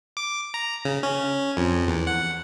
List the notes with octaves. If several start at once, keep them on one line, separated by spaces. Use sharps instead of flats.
D6
A#5
C#3
C#4
F2
E2
F#5